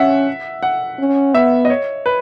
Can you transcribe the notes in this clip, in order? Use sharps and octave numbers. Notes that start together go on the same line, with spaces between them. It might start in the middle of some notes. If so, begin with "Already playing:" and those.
Already playing: C#4 E5 F#5
F#5
C#4
B3 E5
D#5
C#5
B4